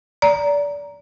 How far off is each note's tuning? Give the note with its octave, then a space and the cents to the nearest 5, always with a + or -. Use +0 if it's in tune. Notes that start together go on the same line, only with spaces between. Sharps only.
D5 -25 A#5 +0